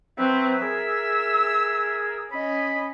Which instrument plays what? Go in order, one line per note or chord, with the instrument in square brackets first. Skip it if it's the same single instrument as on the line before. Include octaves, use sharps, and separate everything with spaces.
[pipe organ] F#3 B4 [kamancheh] C4 [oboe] E5
[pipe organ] G#4 A#4 [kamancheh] E6
[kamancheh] C#4 D#5 [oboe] B5